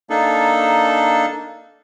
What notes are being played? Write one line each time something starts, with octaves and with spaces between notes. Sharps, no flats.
A#3 D4 D#4 A4